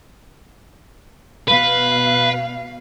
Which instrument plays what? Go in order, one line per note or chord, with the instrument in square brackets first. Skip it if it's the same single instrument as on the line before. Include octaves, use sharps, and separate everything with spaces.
[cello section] B2 F5 [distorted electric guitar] B4